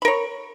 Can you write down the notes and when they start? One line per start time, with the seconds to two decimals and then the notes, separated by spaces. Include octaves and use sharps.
0.02 B5
0.05 A#4
0.08 C#5